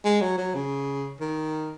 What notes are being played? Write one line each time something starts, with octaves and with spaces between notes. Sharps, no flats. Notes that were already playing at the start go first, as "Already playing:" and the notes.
G#3
F#3
F#3
C#3
D#3